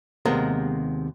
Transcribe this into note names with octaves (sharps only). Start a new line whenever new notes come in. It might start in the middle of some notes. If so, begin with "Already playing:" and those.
D#2 C3 G#3 B3 A#4